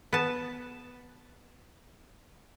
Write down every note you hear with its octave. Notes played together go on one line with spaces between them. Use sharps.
B3 A5